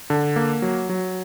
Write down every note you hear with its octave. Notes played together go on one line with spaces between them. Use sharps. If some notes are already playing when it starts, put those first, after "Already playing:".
D3
A#3
F#3
F#3